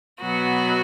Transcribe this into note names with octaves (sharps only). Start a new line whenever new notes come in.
B2 F#3 B3 F#4